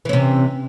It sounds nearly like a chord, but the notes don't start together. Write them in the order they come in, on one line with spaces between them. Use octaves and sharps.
E3 C#4 C3